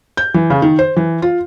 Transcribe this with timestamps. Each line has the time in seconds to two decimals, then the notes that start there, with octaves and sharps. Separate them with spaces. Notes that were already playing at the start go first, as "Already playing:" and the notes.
0.17 G6
0.34 E3
0.50 C#3
0.62 D#3
0.79 C5
0.97 E3
1.22 F4